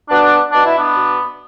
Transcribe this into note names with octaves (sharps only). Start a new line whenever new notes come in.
B2 B3 D4
B2 D4
E4
B3 D4
B2